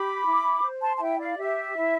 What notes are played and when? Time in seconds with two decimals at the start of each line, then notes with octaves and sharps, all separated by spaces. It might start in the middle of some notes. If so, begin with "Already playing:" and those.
Already playing: G4 B5 D6
0.26 E4
0.63 C5
0.81 A5 C6
0.96 A5
1.00 E4 E5 G5
1.19 D5 F5
1.37 G4 E5
1.76 E4